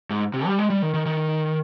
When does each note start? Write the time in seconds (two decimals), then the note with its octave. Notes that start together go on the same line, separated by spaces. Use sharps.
0.10 G#2
0.34 C3
0.46 G3
0.59 G#3
0.70 G3
0.82 D#3
0.94 D#3
1.06 D#3